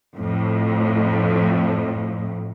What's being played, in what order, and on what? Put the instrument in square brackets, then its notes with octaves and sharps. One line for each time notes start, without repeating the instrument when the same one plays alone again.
[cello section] F2 A2